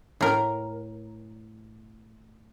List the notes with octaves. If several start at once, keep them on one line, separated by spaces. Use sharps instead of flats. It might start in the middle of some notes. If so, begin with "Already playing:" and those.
A2 A#4